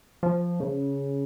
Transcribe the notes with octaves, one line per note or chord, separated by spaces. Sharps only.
F3
C#3